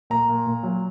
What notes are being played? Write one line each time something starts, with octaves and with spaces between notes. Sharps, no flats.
A#2 A#5
A#2
A#2
F#3